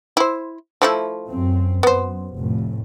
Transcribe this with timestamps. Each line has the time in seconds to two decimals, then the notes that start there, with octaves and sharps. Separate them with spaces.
0.17 E4 C5
0.82 F3 A3 E4
1.29 F#2 C4
1.83 F#2 B3 C5
2.37 F1 A2